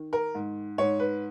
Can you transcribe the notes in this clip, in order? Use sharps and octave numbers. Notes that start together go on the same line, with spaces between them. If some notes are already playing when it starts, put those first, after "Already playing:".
Already playing: D#3
A#4
G#2
G#2 C#5
B4